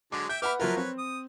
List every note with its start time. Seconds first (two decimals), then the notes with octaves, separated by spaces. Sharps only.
0.12 D3 F#3 G#3 D6
0.29 E5 G5 G6
0.42 B4 E5 F#5 B5 D6 F6
0.60 F3 F#3 E4 F4 A#4 B4
0.77 C4 B4 C#5
0.98 D#6